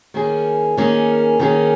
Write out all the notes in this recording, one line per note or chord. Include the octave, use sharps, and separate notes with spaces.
D#3 A#3 C#4 G#4
D#3 A#3 C#4 G#4
D#3 A#3 C#4 G#4